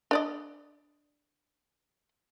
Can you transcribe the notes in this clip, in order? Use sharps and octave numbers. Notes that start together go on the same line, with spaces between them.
D4 D5 D#5